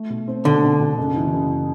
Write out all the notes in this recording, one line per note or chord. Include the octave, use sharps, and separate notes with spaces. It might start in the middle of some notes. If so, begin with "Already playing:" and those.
Already playing: A3
B2
C4
B2 D3
B2
B2
F#1
E3
F#1